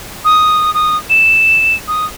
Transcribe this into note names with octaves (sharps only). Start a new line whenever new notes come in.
D#6
D#6
E7
D#6